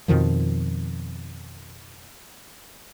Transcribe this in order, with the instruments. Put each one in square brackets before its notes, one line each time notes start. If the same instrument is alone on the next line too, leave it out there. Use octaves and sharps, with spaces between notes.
[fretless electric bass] F2 B2 D#3 F3